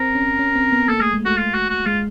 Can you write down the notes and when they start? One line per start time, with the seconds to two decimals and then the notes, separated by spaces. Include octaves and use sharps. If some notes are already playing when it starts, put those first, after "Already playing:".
Already playing: C4 A#4
0.15 C#4
0.39 C#4
0.55 C4
0.72 B3
0.88 A#3 A4
1.01 A3 G#4
1.13 G#3
1.25 A3 F#4
1.37 F4
1.53 F#4
1.69 F#4
1.86 G#3 F4